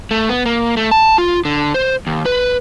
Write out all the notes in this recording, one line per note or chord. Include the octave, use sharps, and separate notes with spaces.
A3
B3
A#3
A3
A5
F4
D3
C5
D#2
B4